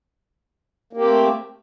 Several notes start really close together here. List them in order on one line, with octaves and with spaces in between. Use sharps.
A#3 G4 C4 A3